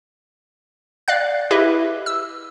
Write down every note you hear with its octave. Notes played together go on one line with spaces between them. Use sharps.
D5 F5 F#6
E4 G4 B4 D#5 E5
E6